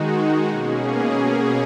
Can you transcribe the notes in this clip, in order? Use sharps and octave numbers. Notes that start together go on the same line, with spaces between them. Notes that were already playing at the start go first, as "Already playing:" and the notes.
Already playing: D#3 G#3 D#4 F#4
B2 A#3 C#4 G#4